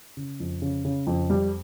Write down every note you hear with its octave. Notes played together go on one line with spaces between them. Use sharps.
C#3
F2
C#3
C#3
F2
G3